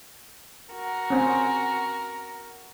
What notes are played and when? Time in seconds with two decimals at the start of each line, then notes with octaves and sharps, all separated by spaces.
0.71 F#4 A#4
1.10 C4 C#4